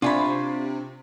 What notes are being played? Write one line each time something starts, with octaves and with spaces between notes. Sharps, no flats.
C3 D4 F4 C#5 G#5 B5